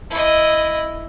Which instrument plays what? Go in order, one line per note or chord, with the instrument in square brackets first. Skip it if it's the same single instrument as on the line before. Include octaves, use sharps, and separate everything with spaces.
[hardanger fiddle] E4 D#5